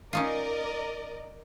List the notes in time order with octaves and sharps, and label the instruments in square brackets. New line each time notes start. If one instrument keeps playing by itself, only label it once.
[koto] C#4 D#4 F4 [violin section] A#4 D5 D#5